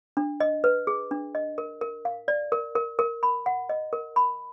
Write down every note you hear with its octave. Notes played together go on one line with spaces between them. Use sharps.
D4
D#5
B4
G#4
D4
D#5
A#4
A#4
F5
D5
A#4
A#4
A#4
B5
F#5
D#5
A#4
B5